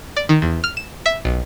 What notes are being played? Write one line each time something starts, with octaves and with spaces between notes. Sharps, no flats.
D5
D#3
E2
F6
E7
E5
B1